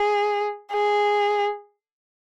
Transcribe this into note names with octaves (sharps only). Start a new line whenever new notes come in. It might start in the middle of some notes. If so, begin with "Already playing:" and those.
Already playing: G#4
G#4